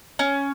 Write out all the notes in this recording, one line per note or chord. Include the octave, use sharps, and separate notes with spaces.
C#4